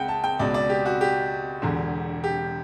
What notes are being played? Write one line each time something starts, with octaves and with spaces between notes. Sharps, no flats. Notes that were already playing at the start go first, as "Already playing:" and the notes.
Already playing: C#2 F#5 G5
A5
G5
C#2 B2 D5
D5
G4
F#4
G4
E1 E2 D3
G4